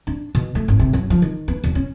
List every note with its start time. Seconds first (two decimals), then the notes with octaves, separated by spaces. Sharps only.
0.07 D4
0.35 B2
0.55 A3
0.68 G#1
0.79 C3
0.93 F#2
1.10 F3
1.22 D#3
1.48 B3
1.64 E1
1.75 C#4